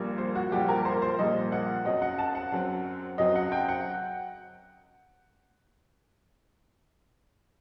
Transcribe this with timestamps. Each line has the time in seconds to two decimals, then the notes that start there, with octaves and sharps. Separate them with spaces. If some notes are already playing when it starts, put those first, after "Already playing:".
Already playing: A#1 A#2 G3 A#3
0.18 C5
0.35 F#4
0.52 A#1 A#2 G3 A#3 G4
0.69 A#4
0.85 C5
1.02 C5
1.19 A#1 A#2 G3 A#3 D#5
1.52 F#5
1.85 F#2 F#3 C4 D#5
2.02 F#5
2.19 A5
2.35 F#5
2.52 F#2 F#3 C4
3.18 F#2 F#3 C4 D#5
3.35 F#5
3.52 G5
3.69 F#5